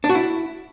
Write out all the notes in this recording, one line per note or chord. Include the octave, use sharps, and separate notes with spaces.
D4
F#4
E4